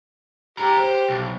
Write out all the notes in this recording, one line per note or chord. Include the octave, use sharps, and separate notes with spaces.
G4 G#4 A#5
C5
B1